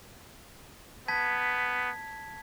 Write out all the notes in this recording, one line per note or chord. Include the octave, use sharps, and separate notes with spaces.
B3 A5 G#6 B6